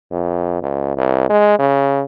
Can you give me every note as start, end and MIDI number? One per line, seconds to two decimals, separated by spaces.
0.11 0.60 41
0.62 0.94 37
0.96 1.25 36
1.29 1.58 56
1.59 2.03 49